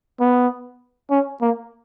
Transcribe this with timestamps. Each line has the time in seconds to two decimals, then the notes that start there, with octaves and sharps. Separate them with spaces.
0.20 B3
1.11 C#4
1.41 A#3